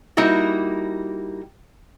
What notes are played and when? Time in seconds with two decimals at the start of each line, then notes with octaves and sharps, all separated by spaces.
0.17 G3 A#3 D#4 E4 F#4